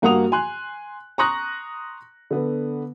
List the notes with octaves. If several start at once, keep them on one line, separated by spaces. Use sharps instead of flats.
G2 A#3 F#4 F#5 D#6 F7
G#5 C6 F#6
A#5 C6 C#6 D#6 F#6 A#6
D3 B3